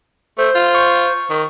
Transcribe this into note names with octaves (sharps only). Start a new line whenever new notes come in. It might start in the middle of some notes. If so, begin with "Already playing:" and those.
A3 C5
F4
C#6
D#3